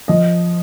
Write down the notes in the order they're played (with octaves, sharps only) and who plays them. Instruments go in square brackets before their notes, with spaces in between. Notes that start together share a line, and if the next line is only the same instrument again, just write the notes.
[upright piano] F3 D#5